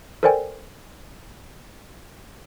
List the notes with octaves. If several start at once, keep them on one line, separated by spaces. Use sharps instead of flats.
A4 A#4 C5 D5 G5 G#5